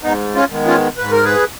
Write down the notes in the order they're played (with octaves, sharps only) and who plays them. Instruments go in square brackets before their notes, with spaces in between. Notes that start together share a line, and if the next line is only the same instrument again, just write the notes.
[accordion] G#2 B3 D#4
C#4 F4
D#3 G#3 B3
C#4 F4
G#2 B4
A#4
G#4 B4